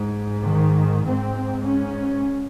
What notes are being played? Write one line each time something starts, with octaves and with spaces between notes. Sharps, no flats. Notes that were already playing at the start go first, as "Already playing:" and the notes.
Already playing: G#2
D#3
G#2 C4
C#4